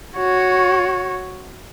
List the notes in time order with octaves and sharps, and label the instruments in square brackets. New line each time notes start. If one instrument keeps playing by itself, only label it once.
[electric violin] F#4 C#5